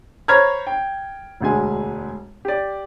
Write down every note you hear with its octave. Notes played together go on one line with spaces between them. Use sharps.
C5 C#5 A#5 B5 F6 G#6
G5
E1 D2 G#3 G#5
G4 D5